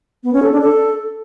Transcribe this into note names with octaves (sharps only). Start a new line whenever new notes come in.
B3
C#4
A4
D4
A4